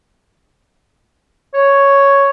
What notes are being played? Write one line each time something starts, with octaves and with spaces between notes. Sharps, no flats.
C#5